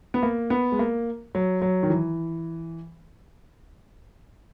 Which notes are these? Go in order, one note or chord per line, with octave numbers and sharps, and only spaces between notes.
B3
A#3
B3
G#3
A#3
F#3
F#3
D#3
E3